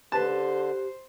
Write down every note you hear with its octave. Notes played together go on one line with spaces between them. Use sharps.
D3 G4 B4 C5 A5